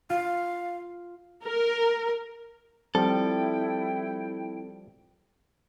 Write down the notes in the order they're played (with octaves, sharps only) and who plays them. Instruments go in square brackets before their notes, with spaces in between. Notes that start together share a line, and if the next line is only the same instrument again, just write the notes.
[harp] F4 [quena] F5
[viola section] A#4
[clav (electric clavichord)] F3 G3 [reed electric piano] C4 [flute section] E4 G5 [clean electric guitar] A4